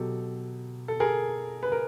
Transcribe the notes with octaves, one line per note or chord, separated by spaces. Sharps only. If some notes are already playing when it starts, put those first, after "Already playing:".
Already playing: B2 F#3 G4 A4
A4
G#4 A#4
B4
A#4